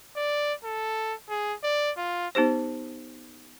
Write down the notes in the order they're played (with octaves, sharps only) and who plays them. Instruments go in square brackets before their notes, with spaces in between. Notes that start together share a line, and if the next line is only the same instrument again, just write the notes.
[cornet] D5
A4
G#4
D5
F4
[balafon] B3 D#4 G4 C5